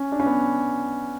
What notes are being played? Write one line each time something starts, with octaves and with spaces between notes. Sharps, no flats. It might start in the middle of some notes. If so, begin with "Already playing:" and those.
Already playing: C#4
D4
C#4
B3